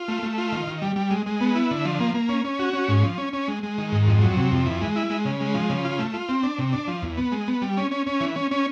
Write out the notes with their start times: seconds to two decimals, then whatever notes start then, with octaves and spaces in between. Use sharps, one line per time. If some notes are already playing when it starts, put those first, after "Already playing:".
Already playing: F4
0.08 A3
0.23 A3
0.38 F4
0.52 D#3
0.67 D#3
0.82 G3
0.96 G3
1.11 G#3
1.26 G#3
1.41 B3
1.55 E4
1.71 D3
1.85 F3
2.00 A#3
2.14 A#3
2.29 C#4
2.45 C#4
2.59 F#4
2.73 C#4
2.88 G#2
3.03 F3
3.18 C#4
3.33 C#4
3.48 G#3
3.63 G#3
3.78 D#3
3.92 G#2
4.07 F2
4.22 F#3
4.37 C3
4.52 F2
4.66 E3
4.81 G#3
4.96 E4
5.10 G#3
5.25 C#3
5.41 G#3
5.54 F3
5.70 C#3
5.85 F4
5.99 A3
6.14 F4
6.29 C4
6.43 D4
6.58 C3
6.73 D4
6.88 F3
7.02 E2
7.18 B3
7.32 G#3
7.48 B3
7.62 G3
7.77 C#4
7.91 C#4
8.07 C#4
8.21 E3
8.36 C#4
8.51 C#4